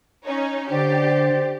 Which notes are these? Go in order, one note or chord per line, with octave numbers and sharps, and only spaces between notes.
C#4 D#4 C#5
D3 G4 C5 D5